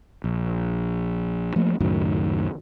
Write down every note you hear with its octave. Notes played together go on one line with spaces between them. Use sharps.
A#1
F3 A3 A#3
C#2 F#2 A2 D#3